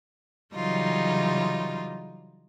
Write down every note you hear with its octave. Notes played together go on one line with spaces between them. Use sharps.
C#3 E3 F#3 G3 D#4 F4